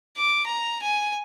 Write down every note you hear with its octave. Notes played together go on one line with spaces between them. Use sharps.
D6
A#5
G#5